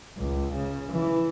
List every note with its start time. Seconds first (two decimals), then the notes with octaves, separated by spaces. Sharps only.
0.17 C#2
0.52 C#3
0.91 E3